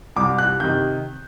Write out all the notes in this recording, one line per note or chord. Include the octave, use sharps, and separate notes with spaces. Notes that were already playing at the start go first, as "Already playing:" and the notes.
C2 D6
F#6
C3 D#3 G6